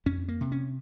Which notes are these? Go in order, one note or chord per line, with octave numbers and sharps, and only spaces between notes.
F2 C#4
A#3
C3
C#4